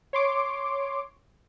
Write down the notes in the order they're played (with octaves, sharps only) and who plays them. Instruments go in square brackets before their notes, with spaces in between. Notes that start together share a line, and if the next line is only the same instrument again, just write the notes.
[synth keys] C#5 C6 D6